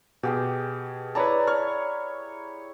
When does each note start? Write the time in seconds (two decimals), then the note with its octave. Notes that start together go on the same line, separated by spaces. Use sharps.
0.23 B2 G4 G#4 G5
1.15 E4 B4 C#5 D5 A5 A#5
1.47 C#5 F6